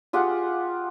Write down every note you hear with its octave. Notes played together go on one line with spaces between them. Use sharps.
F4 G4 G#4 F#5